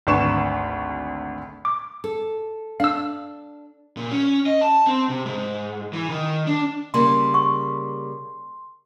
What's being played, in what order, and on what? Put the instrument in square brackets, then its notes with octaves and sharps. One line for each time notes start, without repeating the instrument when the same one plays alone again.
[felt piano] G#1 D2 B4 C#6 E7
[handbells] D6
[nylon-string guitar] A4
[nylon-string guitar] D4 [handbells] F5 E6
[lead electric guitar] A#2
C#4
D#5
A5
C4
C3
G#2
E3
D#3
D4
[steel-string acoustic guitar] C#3 G3 A#3 [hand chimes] C6
[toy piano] C#6